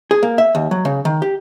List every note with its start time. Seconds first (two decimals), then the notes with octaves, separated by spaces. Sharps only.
0.11 G#4
0.23 A#3
0.38 E5
0.55 D#2
0.71 F#3
0.85 C#3
1.05 D#3
1.22 G4